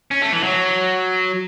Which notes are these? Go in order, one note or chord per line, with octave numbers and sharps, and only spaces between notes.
C#4
A3
E3
F#3